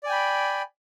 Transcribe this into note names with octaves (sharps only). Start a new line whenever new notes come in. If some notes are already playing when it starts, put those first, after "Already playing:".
D5 G5 G#5 B5